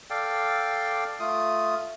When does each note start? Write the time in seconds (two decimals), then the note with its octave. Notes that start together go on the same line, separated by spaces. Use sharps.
0.10 A4 D5 F5 G5
1.20 A3 F4 D#6